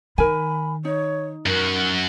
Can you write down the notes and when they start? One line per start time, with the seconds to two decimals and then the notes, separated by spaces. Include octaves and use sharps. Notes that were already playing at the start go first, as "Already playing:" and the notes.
0.18 D#3 A#4 G#5 B5
0.85 D#4 C#5
1.46 F#2 F#4 A#4